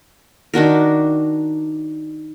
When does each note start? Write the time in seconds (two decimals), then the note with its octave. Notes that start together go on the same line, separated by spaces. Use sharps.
0.54 D#3 D4 F#4 A#4